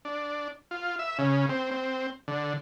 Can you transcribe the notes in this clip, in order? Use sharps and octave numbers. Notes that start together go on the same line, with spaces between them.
D4
F4
E5
C#3
C4
C4
D3